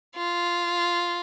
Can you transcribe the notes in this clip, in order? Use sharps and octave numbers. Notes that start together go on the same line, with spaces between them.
F4